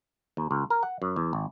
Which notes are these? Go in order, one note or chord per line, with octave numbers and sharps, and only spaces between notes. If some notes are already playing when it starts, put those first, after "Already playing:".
D#2
C#2
A#4
F#5
F#2
E2
G#1